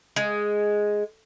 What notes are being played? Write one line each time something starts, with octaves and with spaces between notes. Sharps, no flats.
G#3